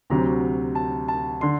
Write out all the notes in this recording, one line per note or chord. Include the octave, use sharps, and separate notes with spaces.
D2 C3 F#3 A#5
A5
A5
D3 C6